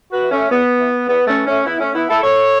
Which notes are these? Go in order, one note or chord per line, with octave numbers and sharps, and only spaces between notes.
F#4 B4
E3
A3 C#4
E2 B3
E3
E2 B3
A3 C#4
E3
A3 C#4
E2 B3 E4
A3 C#4
E3 B3 E4
E4 A4
F#2 A4 C#5